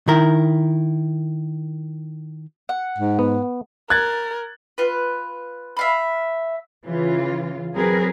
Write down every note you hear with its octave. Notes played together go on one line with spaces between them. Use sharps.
D#3 E4 A#4
F#5
G#2
B3
A#4 F#6 G#6 A6
F4 B4
E5 F5 B5
C#3 E3 F4
F#3 C4 G#4 A#4 B4